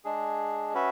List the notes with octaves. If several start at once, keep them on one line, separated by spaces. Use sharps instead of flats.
G#3 D4 G#4
C#4 F#4 B4 E5